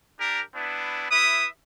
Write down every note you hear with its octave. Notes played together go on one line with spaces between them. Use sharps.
D4 G4 A#4
B3 D4 E4
E4 B4 E5 D#6